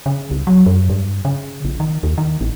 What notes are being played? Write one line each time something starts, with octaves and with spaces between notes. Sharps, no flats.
C#3
C2
F#3
F#2
G2
C#3
A#1
D#3
D#2
D#3
A1